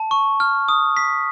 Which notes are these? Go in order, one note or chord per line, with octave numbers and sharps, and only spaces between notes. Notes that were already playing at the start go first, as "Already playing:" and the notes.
Already playing: A5
C#6
F6
D#6
B6